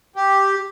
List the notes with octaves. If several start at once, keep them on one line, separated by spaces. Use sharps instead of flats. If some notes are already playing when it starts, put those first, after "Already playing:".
G4